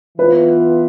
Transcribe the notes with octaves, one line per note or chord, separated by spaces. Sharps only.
E3 B3 F4 B4